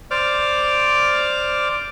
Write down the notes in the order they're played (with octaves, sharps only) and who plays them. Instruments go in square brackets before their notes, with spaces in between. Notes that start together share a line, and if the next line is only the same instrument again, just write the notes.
[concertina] C5 D5 D6 F6